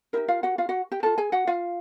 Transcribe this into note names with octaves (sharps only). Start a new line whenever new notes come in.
D#4 E4 G4 A#4 E5
F4 F5
F#4 F#5
F4 F5
F#4 F#5
G4 G5
F4 A4 A#4 A5
G#4 G#5
F#4 F#5
F4 F5